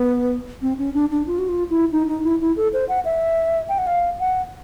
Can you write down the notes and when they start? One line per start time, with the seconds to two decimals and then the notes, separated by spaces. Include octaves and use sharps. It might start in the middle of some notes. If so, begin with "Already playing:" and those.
Already playing: B3
0.62 C4
0.79 C#4
0.94 D4
1.11 D4
1.27 F4
1.39 F#4
1.49 F4
1.70 E4
1.92 D#4
2.08 D#4
2.24 E4
2.41 E4
2.57 A4
2.73 C5
2.89 F#5
3.05 E5
3.69 G5
3.78 F#5
3.87 F5
4.19 F#5